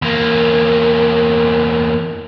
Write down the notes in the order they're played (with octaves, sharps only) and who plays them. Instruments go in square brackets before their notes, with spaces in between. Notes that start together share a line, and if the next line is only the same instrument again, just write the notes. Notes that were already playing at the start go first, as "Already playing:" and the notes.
[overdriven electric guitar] E2 A#3